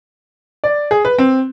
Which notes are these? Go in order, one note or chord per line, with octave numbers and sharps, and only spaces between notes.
D5
G#4
B4
C4